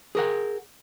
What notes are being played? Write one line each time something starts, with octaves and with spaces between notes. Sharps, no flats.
G#4 A#4 F#5